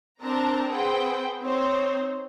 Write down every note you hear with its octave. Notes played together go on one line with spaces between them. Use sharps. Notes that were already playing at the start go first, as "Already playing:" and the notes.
C4 D4 A#4 A5 A#5
C4 G#4 B4 C5 F#5 G5
C4 D#4 C5 C#5